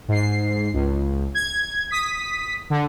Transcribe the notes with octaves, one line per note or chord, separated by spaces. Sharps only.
G#2 C7
C#2
G#6
D#6 B6
D3